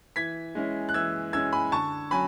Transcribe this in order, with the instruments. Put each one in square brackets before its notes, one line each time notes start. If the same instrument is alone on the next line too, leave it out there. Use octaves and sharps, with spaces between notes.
[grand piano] E3 G#6 B6
G#3 C#4 E4
F#6
E3 E6 G#6
G#3 C#4 E4 E6 G#6
G#5 B5
D3 A5 C#6
F#3 C#4 G#5 B5